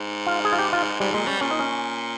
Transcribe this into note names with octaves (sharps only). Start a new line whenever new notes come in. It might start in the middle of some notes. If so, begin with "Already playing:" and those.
Already playing: G#2
F4
G#4
F4
G4
F4
G#2 G3
A#2 G#3
G3 C#4
A#2 C#4
D#4
C#4